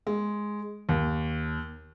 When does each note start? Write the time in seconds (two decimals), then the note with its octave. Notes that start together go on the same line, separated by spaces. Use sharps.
0.07 G#3
0.89 D#2